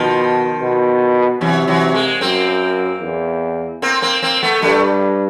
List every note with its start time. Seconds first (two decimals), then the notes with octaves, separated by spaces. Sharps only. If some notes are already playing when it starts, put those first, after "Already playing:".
Already playing: B2 D#3 F3
0.61 B2
1.41 C3 E3 F#3
1.68 E3 F#3
1.94 G#3 A#3
2.21 F#2 A#3 C4
3.01 E2
3.82 A#3 C4
4.02 A#3 C4
4.22 A#3 C4
4.43 A3 B3
4.62 G2 G3 A3